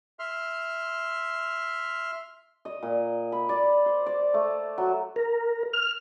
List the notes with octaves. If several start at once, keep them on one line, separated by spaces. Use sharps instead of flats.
E5 C6 F6
D#5
A#2
B5
D5
C5
D5
A3
F#3
A#4
F6